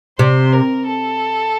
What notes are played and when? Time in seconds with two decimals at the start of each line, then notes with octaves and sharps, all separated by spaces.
0.19 C3 C5
0.53 A#4
0.86 A4